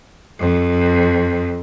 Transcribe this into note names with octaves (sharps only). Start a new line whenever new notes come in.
F2